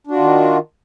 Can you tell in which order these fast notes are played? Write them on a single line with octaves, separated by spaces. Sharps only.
D4 F#4 F4 D#3